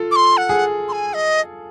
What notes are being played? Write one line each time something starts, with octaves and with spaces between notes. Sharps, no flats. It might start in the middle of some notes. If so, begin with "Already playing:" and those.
Already playing: F4 A4
D6
C6
F#5
G#4
C6
G#5
D#5